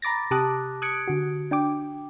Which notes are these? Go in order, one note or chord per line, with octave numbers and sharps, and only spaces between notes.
A#5 B5 D6 A6 A#6
C3 G4 A5 D6 D#6 F#6
D#6 F#6 G#6 C#7 D7
D3 F#4
D4 G5 D6